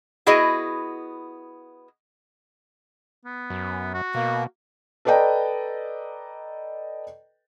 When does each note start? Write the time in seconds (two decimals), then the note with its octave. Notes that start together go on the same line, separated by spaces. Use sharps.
0.26 B3 E4 F#4 G#4 D#5
3.25 B3
3.50 F#2
3.94 F#4
4.15 B2 A#3
5.05 A4 B4 D5 D#5 G5 A#5